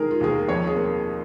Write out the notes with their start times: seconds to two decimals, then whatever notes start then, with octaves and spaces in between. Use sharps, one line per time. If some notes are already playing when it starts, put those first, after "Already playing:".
Already playing: D#3 G#3 G#4 A#4
0.11 F4
0.20 D#2 G#4
0.30 A#4
0.48 F2 C#5
0.67 G#4
0.76 A#3